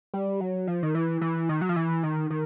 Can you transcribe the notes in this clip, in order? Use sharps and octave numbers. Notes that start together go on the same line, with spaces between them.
G3
F#3
F3
D#3
E3
E3
D#3
F#3
F3
E3
D#3
D#3